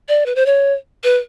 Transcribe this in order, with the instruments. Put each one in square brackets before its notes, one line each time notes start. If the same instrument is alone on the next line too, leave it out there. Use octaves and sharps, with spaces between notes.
[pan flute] D5
B4
C5
C#5
B4